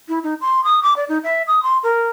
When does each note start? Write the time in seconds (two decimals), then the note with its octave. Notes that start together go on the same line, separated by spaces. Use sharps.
0.09 E4
0.23 D#4
0.41 C6
0.64 D#6
0.83 D6
0.97 D5
1.09 D#4
1.24 E5
1.47 D#6
1.63 C6
1.83 A#4